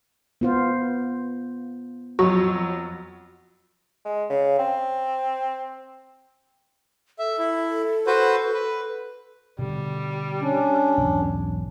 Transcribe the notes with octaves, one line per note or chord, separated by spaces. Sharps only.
B3 F4 C5
F2 F#3 F#4
G#3
C#3
C4
A4 E5
E4
F#4 B4 C5
B4
B2 D3 G3
C#4 D4
B1 E2 G#2